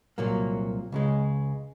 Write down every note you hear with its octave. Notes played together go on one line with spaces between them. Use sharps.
C2 A#2 F#3 A#3
C#2 C#3 G#3